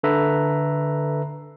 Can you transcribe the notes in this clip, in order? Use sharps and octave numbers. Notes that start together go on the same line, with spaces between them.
D3 A4 B4 E5 A#5